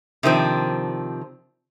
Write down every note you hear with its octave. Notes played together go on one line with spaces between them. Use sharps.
C3 D#3 F3 C4 D4